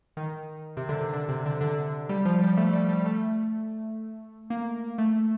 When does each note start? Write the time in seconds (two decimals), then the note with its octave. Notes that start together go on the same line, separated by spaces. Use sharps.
0.17 D#3
0.77 C3
0.89 D3
1.01 C3
1.13 D3
1.29 C3
1.46 D3
1.61 D3
2.09 G3
2.25 F3
2.41 G3
2.57 A3
2.73 G3
2.89 G3
3.06 A3
4.50 A#3
4.98 A3